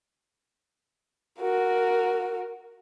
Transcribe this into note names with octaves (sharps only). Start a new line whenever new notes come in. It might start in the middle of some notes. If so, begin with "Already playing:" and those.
F#4 A#4